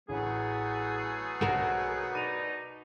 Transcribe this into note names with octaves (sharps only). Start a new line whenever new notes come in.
A1 F#3 A3 B3 G#4
B1 F#4 A#4
B2 D#4 D5 B5 D#7 F7